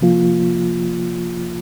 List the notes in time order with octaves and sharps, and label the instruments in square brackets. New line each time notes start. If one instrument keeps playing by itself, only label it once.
[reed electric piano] C3 F3 A#3 F4